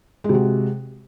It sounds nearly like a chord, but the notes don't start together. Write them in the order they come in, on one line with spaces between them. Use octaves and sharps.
G#3 C3 F#4